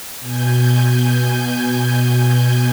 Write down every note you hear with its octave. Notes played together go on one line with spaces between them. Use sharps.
B2 G#5 G6